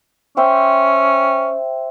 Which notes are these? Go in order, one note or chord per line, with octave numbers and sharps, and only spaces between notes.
C#4 C5 E5 G5